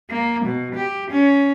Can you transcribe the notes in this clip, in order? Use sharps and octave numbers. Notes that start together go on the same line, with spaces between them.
A#3
B2
G4
C#4